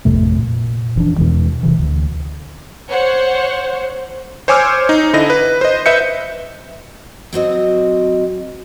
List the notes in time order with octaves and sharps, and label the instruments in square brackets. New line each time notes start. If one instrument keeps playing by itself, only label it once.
[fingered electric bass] A1 F2 C3 A3
A#2
F1 E3 F3 D4
E2 B2 E3 G#3
F1 C3 E3
D2
[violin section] C5 C#5 F#5
[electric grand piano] C5 C#5 G#5 D6 E6 F6
D#4
D3 E4 D#5 A#6
B4
C5 D#5
B4 D#5 E5 G6 C#7
[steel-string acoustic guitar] F#3 C4 F#4 D#5